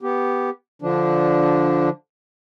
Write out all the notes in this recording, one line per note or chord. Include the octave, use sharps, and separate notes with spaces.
B3 G4
D3 F3 D4